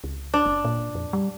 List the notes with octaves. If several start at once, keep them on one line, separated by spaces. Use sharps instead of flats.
C#2
D4
F#1
A#2
F2
G3